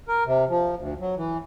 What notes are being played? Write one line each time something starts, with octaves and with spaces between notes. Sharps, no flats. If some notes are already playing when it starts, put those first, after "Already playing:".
A#4
C3
F3
D2
F#3
E3